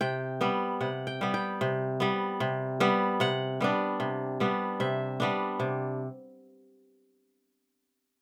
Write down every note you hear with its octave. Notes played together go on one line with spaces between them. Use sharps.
C3 G5
G3 B3
C3 F#5
G5
G3 B3
G5
C3
G3 B3
C3
G3 B3
C3 F#5
G3 B3 D4
C3
G3 B3 D4
C3 E5
G3 B3 D4
C3